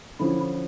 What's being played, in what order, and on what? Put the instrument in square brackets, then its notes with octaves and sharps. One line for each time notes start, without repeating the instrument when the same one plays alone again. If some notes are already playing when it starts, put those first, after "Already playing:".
[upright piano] D3 F3 C#4 [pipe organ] E4